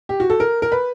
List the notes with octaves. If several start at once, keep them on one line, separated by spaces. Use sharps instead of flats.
G4
F#4
A4
A#4
A#4
B4